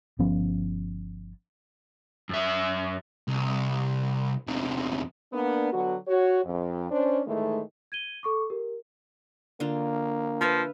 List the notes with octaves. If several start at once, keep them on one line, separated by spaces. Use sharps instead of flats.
G1 F3 B3 C#4
F#2 E5
C2
E2 C3
A#3 B3 D4
D3 F#3 B3 F#4
F#4 C#5
F2
C#4 D4 C5
A2 D#3 E3 G#3 A3
G#6 D#7 G7
A4 C#6 D6
G4 A#4
D3 A#3 F4
F3 B4 E5 F5